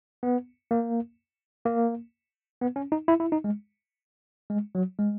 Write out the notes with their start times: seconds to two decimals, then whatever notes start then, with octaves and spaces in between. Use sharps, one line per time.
0.23 B3
0.71 A#3
1.65 A#3
2.61 B3
2.76 C#4
2.92 D#4
3.08 E4
3.20 E4
3.32 D#4
3.44 G#3
4.50 G#3
4.75 F#3
4.99 G#3